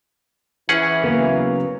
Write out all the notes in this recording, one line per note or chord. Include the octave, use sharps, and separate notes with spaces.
E3 C#4 G#4 F#5
C#3 F#3 A#3 B3